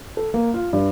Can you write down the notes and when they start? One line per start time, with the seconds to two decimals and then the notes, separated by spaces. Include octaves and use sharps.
0.17 A4
0.34 A#3
0.54 F4
0.73 G2